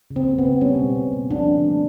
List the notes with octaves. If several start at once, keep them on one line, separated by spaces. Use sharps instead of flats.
C#3
C4
A#3
B3
C#3
G3 C#4
B2
A#3
B2
F3 D4
D3
A3